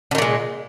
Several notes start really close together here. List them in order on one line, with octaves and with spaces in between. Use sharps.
D3 D#3 A#2 G#3